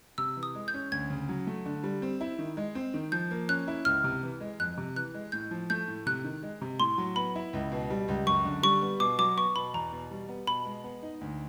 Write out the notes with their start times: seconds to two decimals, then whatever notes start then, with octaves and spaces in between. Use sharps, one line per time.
0.18 C3 E6
0.37 E3
0.43 D#6
0.55 G#3
0.68 G6
0.74 C#4
0.92 D2 G#6
1.10 C#3
1.29 F#3
1.47 A3
1.66 D3
1.83 G3
2.02 C4
2.21 E4
2.39 D#3
2.57 G#3
2.75 C4
2.94 D#3
3.12 F3 G6
3.31 A#3
3.49 C#4 F#6
3.68 E4
3.85 C#2 F6
4.04 C3
4.23 E3
4.41 G#3
4.60 F2 F#6
4.78 C3
4.96 E3 F#6
5.14 G#3
5.32 A2 G6
5.51 F3
5.70 A3 G6
5.88 A2
6.06 C3 F#6
6.24 D#3
6.43 G#3
6.62 C3
6.80 A2 C6
6.98 F#3
7.16 B3 B5
7.35 E4
7.53 C#2
7.72 B2
7.90 G3
8.08 C#2
8.27 F#2 C#6
8.45 D3
8.63 G3 C#6
8.82 B3
9.00 B2 D6
9.19 F#3 D6
9.37 B3 C#6
9.56 B2 B5
9.74 E2 A#5
9.93 B2
10.11 G3
10.29 B3
10.47 B2 B5
10.65 G#3
10.84 B3
11.03 D#4
11.21 D2